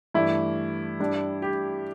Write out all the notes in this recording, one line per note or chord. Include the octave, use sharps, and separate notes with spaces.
G2 E3 A3 E4
G2 G3 D4
G4